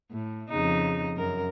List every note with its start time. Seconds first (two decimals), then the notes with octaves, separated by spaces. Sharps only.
0.11 A2
0.50 F2 C#3 D#4
1.16 F#2 A#4